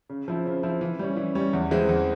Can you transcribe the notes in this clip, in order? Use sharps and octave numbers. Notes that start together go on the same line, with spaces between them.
C#3
F3 C4 E4
C#3
F3 C4 E4
E3
G3 C#4
E3
G3 C#4
E2
E3 G#3 C4
E2